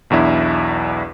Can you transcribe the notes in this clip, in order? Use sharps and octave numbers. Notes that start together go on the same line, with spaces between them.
B1 E2 D4 E4